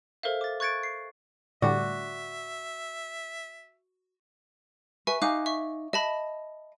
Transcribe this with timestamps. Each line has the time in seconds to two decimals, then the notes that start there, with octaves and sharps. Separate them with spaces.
0.23 A4 A#4 C5 E5 F5
0.41 D6 A6
0.60 C#6 F#6 G#6 A6 C#7 D7
0.83 C7
1.62 A2 D3 G3 F#4 D5 E5
5.07 B4 E5 G#5 C#6
5.22 D#4 F5 G#5 D6 F#6
5.46 E5 C#6
5.93 D#5 E5 A5 B5